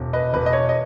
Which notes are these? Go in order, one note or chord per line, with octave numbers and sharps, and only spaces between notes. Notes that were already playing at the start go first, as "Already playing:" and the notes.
Already playing: E1
B4 D#5
E1 B4
D#5
C#5
D#5